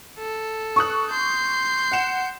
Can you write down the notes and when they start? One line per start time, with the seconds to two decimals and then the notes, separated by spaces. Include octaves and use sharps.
0.19 A4
0.76 C#6 D#6 F#6
1.11 C6 G6
1.91 F#5 E7